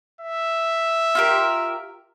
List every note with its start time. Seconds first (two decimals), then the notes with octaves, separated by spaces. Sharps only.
0.21 E5
1.15 F4 G4 A#4